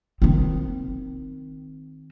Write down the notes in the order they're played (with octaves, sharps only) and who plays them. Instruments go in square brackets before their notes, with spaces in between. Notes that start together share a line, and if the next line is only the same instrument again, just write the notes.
[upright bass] D#3 C4